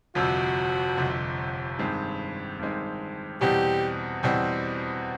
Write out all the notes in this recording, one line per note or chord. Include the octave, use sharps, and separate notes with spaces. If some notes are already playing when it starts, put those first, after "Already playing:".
G1 F2 C3 F#4
G1 F2 C3
G2 D#3 G#3 C4
G2 D#3 G#3 C4
E2 B2 G3 C4 G4
E2 B2 G3 C4